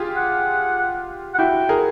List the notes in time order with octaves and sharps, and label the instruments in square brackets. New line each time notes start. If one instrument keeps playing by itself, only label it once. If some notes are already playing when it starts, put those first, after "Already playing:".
Already playing: [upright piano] F4 G4 G#4
[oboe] F#5
F#5
[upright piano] E4 F#4 [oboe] G5
[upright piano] G#4 A#4